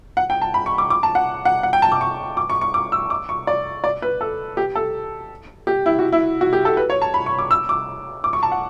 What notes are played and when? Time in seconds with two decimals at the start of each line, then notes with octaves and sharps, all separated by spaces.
0.17 F#5
0.30 G5
0.42 A5
0.54 B5
0.66 C#6
0.78 D6
0.90 D6
1.03 A5
1.15 F#5
1.45 F#5
1.63 F#5
1.73 G5
1.82 A5
1.92 D6
2.01 C#6
2.37 D6
2.50 C#6
2.61 C#6
2.74 D6
2.92 E6
3.10 D6
3.29 C#6
3.47 D5
3.84 D5
4.02 B4
4.21 A4
4.57 G4
4.75 A4
5.67 G4
5.86 E4
5.99 F#4
6.12 E4
6.41 F#4
6.53 G4
6.65 A4
6.77 B4
6.90 C#5
7.02 A5
7.14 B5
7.26 C#6
7.39 D6
7.51 E6
7.69 D6
8.24 D6
8.33 C#6
8.43 A5
8.52 F#5